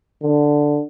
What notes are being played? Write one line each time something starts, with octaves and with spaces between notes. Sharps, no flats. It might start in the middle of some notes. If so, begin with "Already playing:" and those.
D3